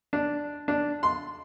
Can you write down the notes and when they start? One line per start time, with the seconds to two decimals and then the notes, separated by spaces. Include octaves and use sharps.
0.13 D4
0.68 D4
1.03 C6